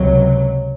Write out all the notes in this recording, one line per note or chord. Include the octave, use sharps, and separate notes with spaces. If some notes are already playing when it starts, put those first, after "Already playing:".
Already playing: C#2 C3 F#3